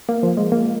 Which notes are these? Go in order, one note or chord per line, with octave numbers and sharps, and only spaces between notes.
A#3
F3
G#3
A#3